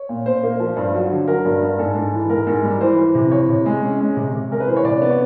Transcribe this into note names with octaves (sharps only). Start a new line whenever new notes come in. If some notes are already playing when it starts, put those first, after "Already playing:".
Already playing: C#5
A#2
A#2 C5
A#3
F3
G2
F#3
D3
F#3 A#4
G2
G2
G#2 A4
G#2
E3
G#2 A#4
G#2
G3
E3 C5
E3
C3
E3 C#5
C3
G#3
C#4
G#3
C3
C3
G#3 A#4
B4
E3 C5
C#5
C3 D5
B3
C#5